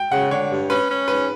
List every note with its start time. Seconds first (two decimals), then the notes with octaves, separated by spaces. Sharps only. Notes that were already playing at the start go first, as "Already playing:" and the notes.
Already playing: G5
0.12 C#3 F#5
0.31 D3 C#5
0.50 G2
0.70 C#4 B4
0.89 C#4
1.07 G#2 B4